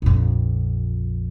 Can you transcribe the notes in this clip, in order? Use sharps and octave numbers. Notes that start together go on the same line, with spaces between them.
A#1 F2